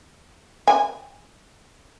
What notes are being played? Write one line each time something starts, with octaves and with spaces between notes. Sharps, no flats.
G#5